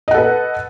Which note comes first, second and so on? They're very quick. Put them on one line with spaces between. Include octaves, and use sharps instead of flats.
D#5 F#5 A4 B4